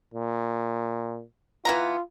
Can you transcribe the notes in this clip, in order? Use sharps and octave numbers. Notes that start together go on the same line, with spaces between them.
A#2
E3 B3 F4 A#5